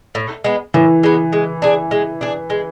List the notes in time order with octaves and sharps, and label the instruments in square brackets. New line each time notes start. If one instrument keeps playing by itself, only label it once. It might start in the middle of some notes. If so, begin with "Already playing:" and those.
[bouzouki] A2
G#3 B3
[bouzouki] A2 [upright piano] E3
[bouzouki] G#3 B3
G#3
D4 G#4
G#3
D4 G#4
G#3